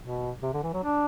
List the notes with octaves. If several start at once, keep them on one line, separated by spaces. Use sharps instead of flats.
B2
C3
D3
E3
F#3
D4